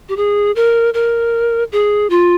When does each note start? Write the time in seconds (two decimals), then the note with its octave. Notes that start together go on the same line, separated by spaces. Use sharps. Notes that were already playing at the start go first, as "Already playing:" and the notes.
0.09 G4
0.17 G#4
0.56 A#4
0.94 A#4
1.72 G#4
2.10 F4